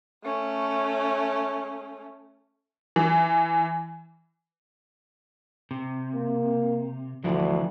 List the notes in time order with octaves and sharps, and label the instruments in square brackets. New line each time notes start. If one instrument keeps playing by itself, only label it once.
[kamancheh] A3 C#4
[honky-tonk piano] E3
[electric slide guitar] C3
[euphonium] A#3
[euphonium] D2 [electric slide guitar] D3 E3 F3